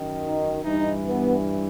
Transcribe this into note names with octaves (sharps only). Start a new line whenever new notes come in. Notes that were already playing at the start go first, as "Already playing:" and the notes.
Already playing: F#2 D#3
D#4
G2 E3 D#4
B3